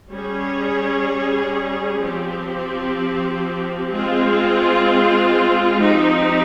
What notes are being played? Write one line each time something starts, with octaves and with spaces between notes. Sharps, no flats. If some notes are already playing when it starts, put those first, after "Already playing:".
G3 C#4 G#4 C#5
F3 C4 G4
G#3 C4 F4
F3 C4 D#4 G4